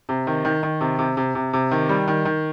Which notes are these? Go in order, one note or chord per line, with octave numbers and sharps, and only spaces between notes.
C3
D#3
D#3
D#3
C3
C3
C3
C3
C3
D#3
G3
D#3
D#3